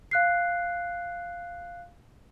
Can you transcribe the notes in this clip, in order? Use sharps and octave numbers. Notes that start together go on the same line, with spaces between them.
F5 F#6 C7